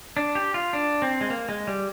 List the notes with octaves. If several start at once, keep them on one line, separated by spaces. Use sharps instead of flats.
D4
G4
F4
D4
C4
G#3
A#3
G#3
G3